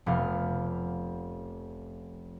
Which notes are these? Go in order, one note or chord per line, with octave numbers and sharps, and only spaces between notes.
F1 B3 F5